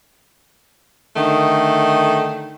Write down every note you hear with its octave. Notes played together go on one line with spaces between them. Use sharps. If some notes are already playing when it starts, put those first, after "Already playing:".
D3 D#3 A3